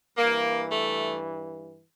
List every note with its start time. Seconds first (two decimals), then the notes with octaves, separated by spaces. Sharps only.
0.18 G2 E3 A#3
0.70 A3